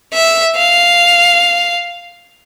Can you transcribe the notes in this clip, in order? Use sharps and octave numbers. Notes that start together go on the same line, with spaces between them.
E5
F5